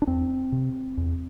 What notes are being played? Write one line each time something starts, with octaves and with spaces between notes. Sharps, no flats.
D4
E2 C4
C3
E2